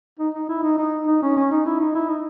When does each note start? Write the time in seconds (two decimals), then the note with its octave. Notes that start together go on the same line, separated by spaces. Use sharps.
0.19 D#4
0.35 D#4
0.49 E4
0.63 D#4
0.78 D#4
1.07 D#4
1.22 C#4
1.37 C#4
1.51 D#4
1.66 E4
1.80 D#4
1.95 E4
2.08 D#4